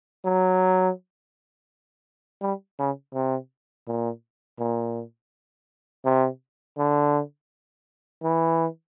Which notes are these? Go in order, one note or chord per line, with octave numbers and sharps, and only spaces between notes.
F#3
G3
C#3
C3
A#2
A#2
C3
D3
E3